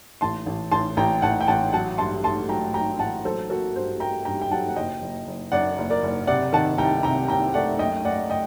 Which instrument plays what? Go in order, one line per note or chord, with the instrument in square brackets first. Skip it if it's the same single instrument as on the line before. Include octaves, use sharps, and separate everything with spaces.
[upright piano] A1 A5 C6
A1
A1 A5 C6
A1 G5 A#5
A1 F#5 A5
G5
A1 F#5 A5
F#3 F#5 A5
G2 A5 C6
A3 A5 C6
F#3 G5 A#5
F#3 G5 A#5
A1 F#5 A5
F#3 A4 C5
A#3 F#4 A4
G2 A4 C5
A#3 G5 A#5
G2 G5 A#5
G5
F#3 F#5 A5
F#5
F#1 D#5 G5
F#1
F#1
F#2 D5 F#5
F#1
A#4 D5
F#1
C3 D5 F#5
D#3 F#5 A5
C2 G5 A#5
C3 G5 A#5
C2 G5 A#5
A3 D5 F#5
F#2 D#5 G5
F#2 D5 F#5
D#5 G5